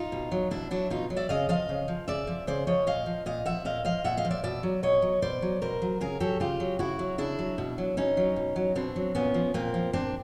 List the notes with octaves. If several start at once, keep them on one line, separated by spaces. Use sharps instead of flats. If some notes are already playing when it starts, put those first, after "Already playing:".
Already playing: D#4 F4
B2
F#3
B2 D4 E4
F#3 D4 E4
B2 D#4 F4
F#3
D5 E5
C#3 D#5 F5
F3 D#5 F5
C#3
F3
C#3 D5 E5
F3
C#3 C5 D5
F3 C#5 D#5
A#2 D#5 F5
F3
A#2 D#5 F5
F3 E5 F#5
A#2 D#5 F5
F3 D#5 F5
A#2 E5 F#5
D#5 F5
F3
D5 E5
B2 D5 E5
F#3
B2 C#5 D#5
F#3
B2 C5 D5
F#3
B2 A#4 C5
F#3
C#3 G#4 A#4
F#3 G4 A4
C#3 F4 G4
F#3
C#3 E4 F#4
F#3
C#3 D4 E4
F#3
B2
F#3
B2 C#4 D#4
F#3
B2
F#3
B2 C4 D4
F#3
A#2 B3 C#4
F3
A#2 A#3 C4
F3
A#2 C4 D4